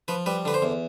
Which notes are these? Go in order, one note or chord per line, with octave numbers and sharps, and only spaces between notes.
F3 B4
G3 B4
D3 B4
C5
E2